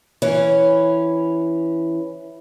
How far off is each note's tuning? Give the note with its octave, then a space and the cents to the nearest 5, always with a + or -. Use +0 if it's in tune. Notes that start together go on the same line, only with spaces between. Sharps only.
E3 +0 C#4 +0 C#5 +0